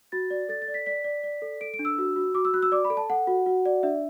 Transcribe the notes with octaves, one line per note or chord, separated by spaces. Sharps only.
F#4 A6
D5
A4 A6
A6
D5
B6
D5 B6
D5
D5
A4
A4 D7
D7
D4
E6
F#4
F#4
F#4 D6
E6
F#4 F#6
E6
D5 D6
B5
A4
A5
A4 F#5
F#4
F#4
D5
D4 E5